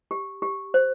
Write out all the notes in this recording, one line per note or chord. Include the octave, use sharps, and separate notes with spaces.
G4
G4
C5